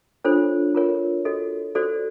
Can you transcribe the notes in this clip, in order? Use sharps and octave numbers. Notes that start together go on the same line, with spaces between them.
D4 F4 A4 C5 C#5
F4 A#4 C#5
F#4 A4 C#5 D#5
F#4 A4 C5 D5